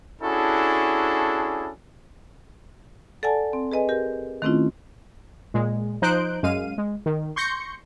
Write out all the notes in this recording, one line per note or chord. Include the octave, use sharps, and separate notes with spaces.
C#4 D4 E4 F#4 G#4 A4
A4 D5 F#5 G#5 A5
C4
G#4 B4 D#5 G#5
G4 A#4
D#3 A3 C4 C#4 E4 F4
A#2 G#3
F3 D#4 C5 F#6 G6 D7
F#2 G#3 F5 D#7
G#3
D#3
C6 C#6 G6 A#6 C#7